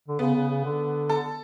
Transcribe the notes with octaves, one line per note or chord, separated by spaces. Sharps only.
D3
C#3 B3
C#3
C#3
D3
A4